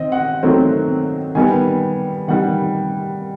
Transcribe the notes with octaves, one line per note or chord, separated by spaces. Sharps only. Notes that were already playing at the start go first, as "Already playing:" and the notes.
Already playing: D#3 C4 D#5
F#5
D#3 F#3 A3 C4
D#3 G3 B3 G#5
D#3 G3 F#5